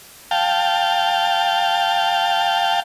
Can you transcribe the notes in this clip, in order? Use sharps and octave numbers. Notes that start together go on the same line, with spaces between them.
F5 G5 A5